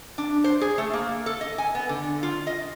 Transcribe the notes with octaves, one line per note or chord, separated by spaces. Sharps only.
D4
C5
G#4
A3
A#3
A4
D#5
G#5
B3
D3
F4
D#5